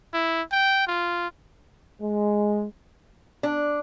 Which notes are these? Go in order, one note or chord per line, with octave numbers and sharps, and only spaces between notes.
E4
G5
F4
G#3
D4